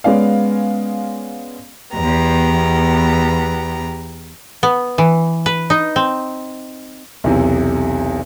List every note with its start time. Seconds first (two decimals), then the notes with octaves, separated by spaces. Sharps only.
0.04 G#3 B3 C#4 D5 F5
1.95 E2 B3 G4 A#5
4.63 B3
4.98 E3
5.46 B4
5.70 D#4
5.96 C4
7.24 B1 E2 C3